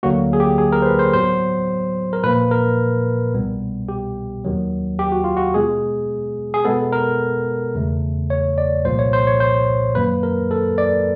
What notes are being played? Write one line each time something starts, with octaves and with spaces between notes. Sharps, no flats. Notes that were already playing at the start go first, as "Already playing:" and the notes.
D2 D3 F#3 A#3 F#4
G#4
G4
G#4
A#4
C5
B4
C5
A2 F#3 B3 C5
A#4
A#2 F3 A#3 B4
A#4
C2 B2 G3 B3
G4
D#2 D#3 F#3
G4
F#4
F4
F#4
B2 G#3 B3 G#4
G#4
B2 G#3 B3 A4
A#4
E2 C#3 E3 A3
C#5
D5
C2 A#2 F3 C5
C#5
C5
C#5
C5
F#2 D#3 F#3 A#3 B4
A#4
A4
D5